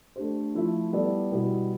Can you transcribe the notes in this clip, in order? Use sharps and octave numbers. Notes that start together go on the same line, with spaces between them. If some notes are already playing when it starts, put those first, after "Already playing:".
A3 D4 G4 C5
F3 A3 E4 A4 E5
G3 B3 E4 A4 D5
B2 G3 B3 E4